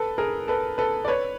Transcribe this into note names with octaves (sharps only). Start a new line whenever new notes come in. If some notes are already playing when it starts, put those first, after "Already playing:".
Already playing: A4 B4
G#4 A#4
A4 B4
A4 B4
D5
B4 C#5